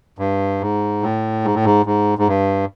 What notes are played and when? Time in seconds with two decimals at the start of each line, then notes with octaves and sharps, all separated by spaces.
0.19 G2
0.61 G#2
1.02 A2
1.45 G#2
1.55 A2
1.65 G#2
1.86 G#2
2.18 G#2
2.28 G2